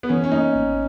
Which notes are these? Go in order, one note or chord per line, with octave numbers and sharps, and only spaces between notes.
B3
E3 C#4
C#4
A#3 D#4
G#1